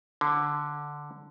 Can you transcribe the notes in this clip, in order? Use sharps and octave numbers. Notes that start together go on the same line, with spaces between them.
D3